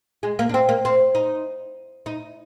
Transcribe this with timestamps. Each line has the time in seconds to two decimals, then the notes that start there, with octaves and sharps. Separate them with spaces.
0.23 G#3
0.39 A#3
0.49 D4
0.54 C4
0.69 A#3
0.85 C4
1.15 D#4
2.06 D#4